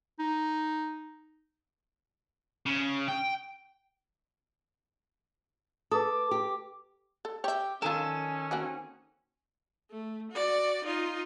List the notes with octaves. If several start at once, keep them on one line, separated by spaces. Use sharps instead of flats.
D#4
C#3
G5
A4 B4 D6 D#6
G4
A4
G4 C#5 E5
D#3 C#4 F4 A4 A#4
A#3 C4 F#4
A3
F#4 D5
D#4 F4